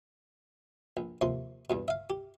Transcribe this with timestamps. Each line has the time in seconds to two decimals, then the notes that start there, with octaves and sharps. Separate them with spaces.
0.97 A#1
1.21 D#2 C3 F3 C6
1.70 E2 G2 B2
1.88 E5 F5
2.10 G4